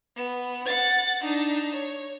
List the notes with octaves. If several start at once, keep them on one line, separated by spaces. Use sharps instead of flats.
B3
F#5 A6
D4 D#4
C#5